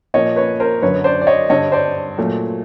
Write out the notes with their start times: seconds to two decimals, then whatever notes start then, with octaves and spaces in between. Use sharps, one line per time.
0.14 A#2 F3 A#3 C#5 D#5
0.36 B4 C#5
0.60 A#4 C5
0.82 F#2 D3 F#3 B4 C#5
1.04 C5 D5
1.21 D5
1.27 C#5 D#5
1.50 G2 D3 G3 C#5 D#5
1.72 C5 D5
2.18 A#2 F#3 A3